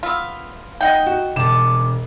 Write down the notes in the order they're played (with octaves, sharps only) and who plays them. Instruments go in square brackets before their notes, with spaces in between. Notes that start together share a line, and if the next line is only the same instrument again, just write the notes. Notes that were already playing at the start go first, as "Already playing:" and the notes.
[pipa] B3 F4 [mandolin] E5 E6 F6
[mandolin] D#4 [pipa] D#5 F#5 G5
[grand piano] F#4
[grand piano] E1 E7 [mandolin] G4 A5